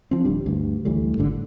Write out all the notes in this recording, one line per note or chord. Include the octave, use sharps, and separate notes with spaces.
E3 F3 C4
D#1 D#2 G3 D4
D2 G2
D2 E3 G3 A3
G#1 G2 D3
A2